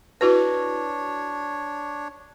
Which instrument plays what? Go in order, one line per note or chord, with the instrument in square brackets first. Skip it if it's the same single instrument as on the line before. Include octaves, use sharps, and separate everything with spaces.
[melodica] D4 C#5 [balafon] E4 F#4 B4